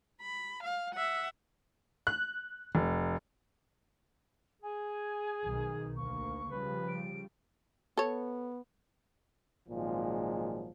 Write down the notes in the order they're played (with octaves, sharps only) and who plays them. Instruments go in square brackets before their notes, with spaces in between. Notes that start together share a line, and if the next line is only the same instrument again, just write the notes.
[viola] B5
F5
E5 F#5
[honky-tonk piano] F#6
F1
[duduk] G#4 [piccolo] G#5
[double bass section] B1 D#3
[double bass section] D2 A#3 [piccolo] C#6
[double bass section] C#3 F3 G3 [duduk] B4
[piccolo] D7
[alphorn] B3 [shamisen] A4 C#5
[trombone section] G#1 A#2 F3 F#3 G#3